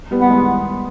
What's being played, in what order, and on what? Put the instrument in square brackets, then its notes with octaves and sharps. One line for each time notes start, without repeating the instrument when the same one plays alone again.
[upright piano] G3 B3
[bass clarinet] B3
[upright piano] G#3